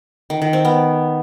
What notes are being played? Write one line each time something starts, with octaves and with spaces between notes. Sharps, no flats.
D#3
D#3
C4
B3